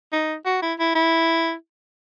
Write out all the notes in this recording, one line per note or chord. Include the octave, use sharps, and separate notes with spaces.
D#4
F#4
E4
E4
E4